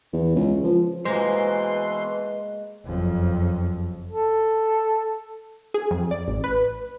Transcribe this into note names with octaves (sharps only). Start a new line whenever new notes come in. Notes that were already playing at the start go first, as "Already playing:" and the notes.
E2
C#2
F3
B2 E3 G#3 A#3 B4 C5 C6
F#1 F2
A4
G#4
F2
D5
A1
B4